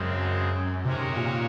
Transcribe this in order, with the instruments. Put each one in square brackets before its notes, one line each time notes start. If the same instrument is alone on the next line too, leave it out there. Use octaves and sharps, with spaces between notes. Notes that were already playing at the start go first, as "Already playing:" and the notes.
Already playing: [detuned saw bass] F#2 [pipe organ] C#3 G#3 C4
[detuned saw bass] C3 [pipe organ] D#3 G#3 C#4 F#4 A#4
[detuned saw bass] C3
A#2